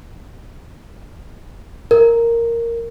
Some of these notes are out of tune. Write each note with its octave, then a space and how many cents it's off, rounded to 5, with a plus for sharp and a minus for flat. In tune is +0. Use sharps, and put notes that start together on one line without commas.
A#4 -5